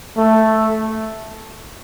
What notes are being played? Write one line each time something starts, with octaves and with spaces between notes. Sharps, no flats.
A3